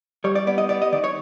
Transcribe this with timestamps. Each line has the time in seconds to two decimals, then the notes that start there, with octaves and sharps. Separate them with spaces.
0.24 G3 C#5
0.35 D5
0.47 B3 D5
0.58 D#5
0.69 B3 D5
0.82 D#5
0.92 D#3 D5
1.04 C#5